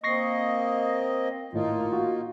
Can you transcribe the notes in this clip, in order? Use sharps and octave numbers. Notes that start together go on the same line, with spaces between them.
A#3 C4 D#5 C#6 A#6 C7
G#1 A2 A#3 D#4 F4
F#4